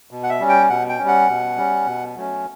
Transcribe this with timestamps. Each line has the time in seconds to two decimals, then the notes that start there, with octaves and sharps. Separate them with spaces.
0.11 B2
0.23 F#5
0.29 E5
0.40 G3 C#4
0.49 G5
0.69 B2 F#5
0.89 G5
0.99 G3 C#4
1.08 F#5
1.29 B2
1.57 G3 C#4
1.87 B2
2.16 F#3 A3 C#4